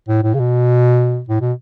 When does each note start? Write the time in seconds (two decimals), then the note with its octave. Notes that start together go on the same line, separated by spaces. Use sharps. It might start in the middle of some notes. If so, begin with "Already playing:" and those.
0.09 A2
0.23 A2
0.34 C#3
0.39 B2
1.29 A2
1.41 B2